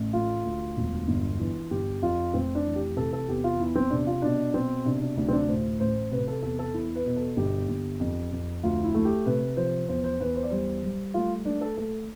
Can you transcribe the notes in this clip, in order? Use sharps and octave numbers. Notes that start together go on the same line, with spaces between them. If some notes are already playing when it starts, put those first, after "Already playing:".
Already playing: A1
A3 F4
D2
E1
G1
E3
G1 G4
F2 F4
F1 C4
D4
E3
G4
C3 A4
A4
E2 G4
F4
E2 E4
C4
C3 D4
F4
B2 D4
B2 C4
C3 D4
D4
D2 D4
C4
D4
A2 C5
A1 C5
C3 B4
A4
E2 A4
A4
E2 E4
B4
B2
A4
G1 G4
G1
F2
F2
D2 F4
E4
A3
G4
C3 B4
F3 C5
E2 C5
C5
E2 B4
C5
D5
G3 C5
G3
A3 F4
A3 D4
A4
A3 A4